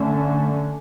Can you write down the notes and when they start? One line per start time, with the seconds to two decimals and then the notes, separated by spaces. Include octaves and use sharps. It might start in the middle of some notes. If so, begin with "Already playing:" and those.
Already playing: D3 A3 C#4